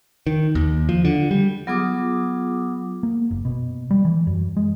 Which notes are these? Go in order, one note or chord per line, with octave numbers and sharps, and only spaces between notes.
D#3
D#2
F3
D3
G3
F#3 B3 F4 G#4 D6 D#6
A#3
F#1
B2
G3
E3
F#2
G#3